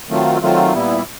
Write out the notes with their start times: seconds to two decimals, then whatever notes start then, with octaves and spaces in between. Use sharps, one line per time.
0.09 D#3 F#3 A3 C4 F4
0.41 D#3 F#3 A3 C4 F4
0.74 A#2 G3 B3 E4